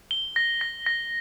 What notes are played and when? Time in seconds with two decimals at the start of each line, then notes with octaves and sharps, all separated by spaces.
0.11 G7
0.36 A#6
0.61 A#6
0.86 A#6